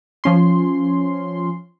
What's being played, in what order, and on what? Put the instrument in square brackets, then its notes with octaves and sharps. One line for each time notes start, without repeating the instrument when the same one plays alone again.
[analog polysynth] F3 C#4 C6